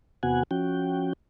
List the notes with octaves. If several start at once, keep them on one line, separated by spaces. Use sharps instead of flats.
E2 C3 B3 F#4 F#5 G#5
F3 C#4 F#4 G5